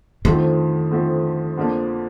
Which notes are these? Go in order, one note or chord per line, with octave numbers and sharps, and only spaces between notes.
F2 D3 D#3 F3 A3 C4
F2 D3 F3 A3 C4
F2 D3 F3 A#3 D4